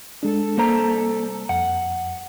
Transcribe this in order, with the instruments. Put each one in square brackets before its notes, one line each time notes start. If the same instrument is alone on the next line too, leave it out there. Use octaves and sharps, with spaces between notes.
[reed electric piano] G#3 D4 [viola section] A4
[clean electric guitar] C2 C5 A#5 [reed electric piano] A#3
[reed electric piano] F2 [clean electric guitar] F#5